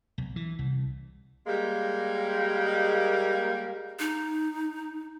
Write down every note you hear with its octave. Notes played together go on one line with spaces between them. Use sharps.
B1
E3
C2
G3 G#3 A#3
D#4